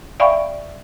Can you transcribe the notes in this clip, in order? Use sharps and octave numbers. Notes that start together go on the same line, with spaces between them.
D5 E5 F5 G5 B5 C#6